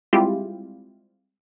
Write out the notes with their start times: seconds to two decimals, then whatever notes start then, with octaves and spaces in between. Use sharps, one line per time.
0.13 G3 G#3 C4 E4 F4 G4